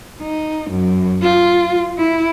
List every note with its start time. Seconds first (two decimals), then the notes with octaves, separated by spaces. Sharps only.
0.22 D#4
0.70 F#2
1.22 F4
1.98 E4